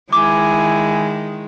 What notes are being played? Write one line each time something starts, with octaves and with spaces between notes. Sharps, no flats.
D#3 G#3 E4 G#5 D6